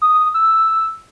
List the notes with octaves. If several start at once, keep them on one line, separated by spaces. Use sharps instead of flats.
D#6
E6